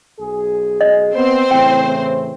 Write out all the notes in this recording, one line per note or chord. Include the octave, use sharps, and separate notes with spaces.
B1 G#4
D#5
B3 C4 C5
A2 C#3 E3 G5